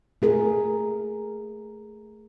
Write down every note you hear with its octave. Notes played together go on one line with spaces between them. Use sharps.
A3 G#4 A#4